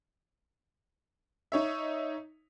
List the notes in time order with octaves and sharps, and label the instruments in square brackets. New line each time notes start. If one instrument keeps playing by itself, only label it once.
[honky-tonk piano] D#4 C#5 E5